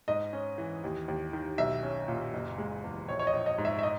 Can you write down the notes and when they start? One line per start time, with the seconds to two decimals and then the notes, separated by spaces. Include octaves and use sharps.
0.08 G#2 D#5
0.33 C#4
0.58 E3
0.84 D#2
1.08 D#2
1.33 D#3
1.58 B1 E5
1.83 C#4
2.08 A#2
2.33 F#1
2.58 G#3
2.83 E2
3.08 A#1 C#5
3.19 C#5
3.27 D#5
3.33 A#1
3.46 D#5
3.58 G#2
3.65 E5
3.79 E5
3.83 D#5